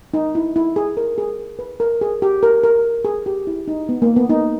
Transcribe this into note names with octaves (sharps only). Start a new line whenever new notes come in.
D#4
E4
E4
G#4
A#4
G#4
B4
A#4
G#4
G4
A#4
A#4
G#4
G4
E4
D#4
B3
A#3
B3
D#4